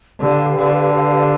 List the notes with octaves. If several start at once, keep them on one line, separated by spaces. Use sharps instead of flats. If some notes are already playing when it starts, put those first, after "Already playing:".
D3 G4 B4 D5 F5
D3